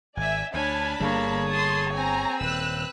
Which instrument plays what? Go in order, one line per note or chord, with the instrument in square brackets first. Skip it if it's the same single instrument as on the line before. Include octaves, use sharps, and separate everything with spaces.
[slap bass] G#1 [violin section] D5 E5 [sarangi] G#5
[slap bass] D2 [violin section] D4 A5 B5 [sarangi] C#5 [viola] G#5
[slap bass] G1 D3 G3 [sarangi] A#3 [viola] G#4 C#5
[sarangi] A5 [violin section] C6 D#6
[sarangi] C4 [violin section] G#5 A#5
[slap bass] D#1 [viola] B4 [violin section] E6 F#6